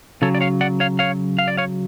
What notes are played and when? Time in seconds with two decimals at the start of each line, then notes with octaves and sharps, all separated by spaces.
0.22 C#3 F#3 A4 C#5
0.35 D5
0.41 C#5 F5
0.61 D5 F#5
0.80 C#5 F5
0.99 C#5 F5
1.39 F5
1.48 D5
1.57 C#5 F5